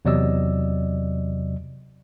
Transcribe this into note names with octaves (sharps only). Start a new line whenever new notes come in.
E2 C3 F#3 D5 D#5 E6